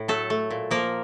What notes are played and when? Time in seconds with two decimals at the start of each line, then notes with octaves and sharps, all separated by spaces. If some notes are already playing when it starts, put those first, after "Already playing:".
Already playing: A2
0.08 F#3 A3 A4
0.30 A3
0.50 A#2
0.71 F3 A#3 A#4